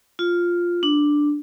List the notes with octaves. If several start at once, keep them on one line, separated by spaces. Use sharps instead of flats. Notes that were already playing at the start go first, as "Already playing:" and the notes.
F4
D4